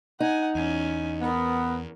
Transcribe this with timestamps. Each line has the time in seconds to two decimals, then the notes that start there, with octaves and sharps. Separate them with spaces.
0.20 D#4 F#5 G#5
0.55 E2 C#4 G#5
1.22 B3 A#4